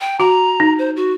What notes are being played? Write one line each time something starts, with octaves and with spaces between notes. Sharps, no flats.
G5
F#4 A#5
D#4
C5
F#4